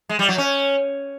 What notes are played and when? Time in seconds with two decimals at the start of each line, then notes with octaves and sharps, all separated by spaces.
0.09 G#3
0.19 G3
0.29 F#3
0.38 C#4